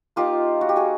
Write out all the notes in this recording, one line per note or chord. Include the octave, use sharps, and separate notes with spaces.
A#3 D#4 F4 G4
F#4
G4
F#4 G#4